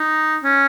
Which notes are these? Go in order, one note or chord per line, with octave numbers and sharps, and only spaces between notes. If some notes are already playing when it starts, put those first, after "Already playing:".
Already playing: D#4
C#4